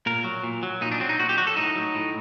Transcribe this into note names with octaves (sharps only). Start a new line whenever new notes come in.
A#2 A#4
F#3
A#2
F#3
A#2 D#4
D4
F#3 C4
D#4
A#2 F#4
G4
F#3 F#4
A4
A2 D#4
F#3
A2